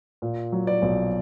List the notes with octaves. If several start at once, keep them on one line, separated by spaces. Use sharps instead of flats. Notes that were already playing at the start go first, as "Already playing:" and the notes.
A#2
F#3
D5
B1